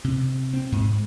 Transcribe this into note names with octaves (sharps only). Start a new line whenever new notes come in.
C3
C4
G#2